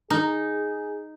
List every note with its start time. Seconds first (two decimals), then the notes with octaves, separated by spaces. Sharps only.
0.10 D#4 G#4